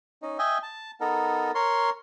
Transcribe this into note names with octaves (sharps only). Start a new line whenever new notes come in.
C#4 D#4
D#5 E5 G5 G#5
A5
B3 D#4 A4 A#4
A#4 C#5 C6